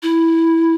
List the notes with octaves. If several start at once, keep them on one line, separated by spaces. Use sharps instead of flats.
E4